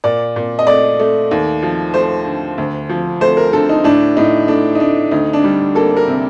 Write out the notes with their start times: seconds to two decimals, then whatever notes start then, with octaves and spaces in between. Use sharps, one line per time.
0.04 A#2 D5
0.36 A#2
0.59 D#5
0.67 A3 D5
1.00 A3
1.31 D#2
1.63 F3
1.94 A3 C5
2.26 D3
2.58 D2
2.89 F3
3.21 A3 C5
3.37 A#4
3.53 D3 A4
3.69 D#4
3.84 A2 D4
4.17 A2 D#4
4.48 A3 D4
4.75 D#4
4.80 A3 D4
5.11 D2 D#4
5.33 D4
5.44 G3
5.75 A#3 A4
5.97 A#4
6.07 C3